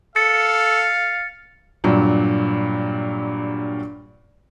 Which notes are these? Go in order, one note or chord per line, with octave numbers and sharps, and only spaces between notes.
A4 F5 A6 C#7
G2 A#2 F#3